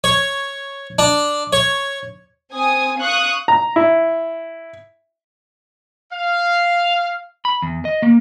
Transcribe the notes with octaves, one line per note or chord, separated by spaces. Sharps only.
C#5
D4
C#5
C4 G#5 D#6
F5 C#6 D#6 F#6
A#5
E4
F5
B5
E2
D#5
A#3